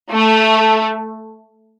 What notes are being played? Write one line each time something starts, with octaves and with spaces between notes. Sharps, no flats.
A3